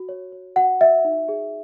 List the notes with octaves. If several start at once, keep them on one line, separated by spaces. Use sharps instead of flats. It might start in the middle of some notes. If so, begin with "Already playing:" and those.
Already playing: F#4
C#5
C#5
F#4 F#5
F#4 E5
D#4
G#4